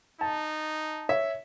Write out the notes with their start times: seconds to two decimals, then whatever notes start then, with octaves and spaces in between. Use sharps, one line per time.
0.21 D#4 A5
1.09 C#5 E5